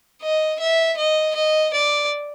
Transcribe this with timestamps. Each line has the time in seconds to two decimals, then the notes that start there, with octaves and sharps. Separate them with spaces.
0.22 D#5
0.60 E5
0.97 D#5
1.35 D#5
1.73 D5